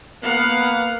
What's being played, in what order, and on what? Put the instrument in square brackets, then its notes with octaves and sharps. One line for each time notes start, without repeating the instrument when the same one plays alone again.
[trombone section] A#3 B3 [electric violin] F5 F#5